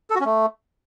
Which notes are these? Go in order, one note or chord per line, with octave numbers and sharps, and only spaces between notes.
A4
F#4
C#4
A3